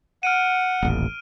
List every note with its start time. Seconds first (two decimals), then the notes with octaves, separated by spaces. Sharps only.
0.23 F#5 F6 D7 D#7
0.82 D#1 A1